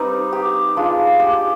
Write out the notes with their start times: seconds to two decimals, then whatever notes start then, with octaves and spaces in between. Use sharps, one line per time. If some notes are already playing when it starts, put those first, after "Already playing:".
Already playing: G3 C4 D#4 B4
0.33 G4
0.76 G#3 D4 F4
1.20 G4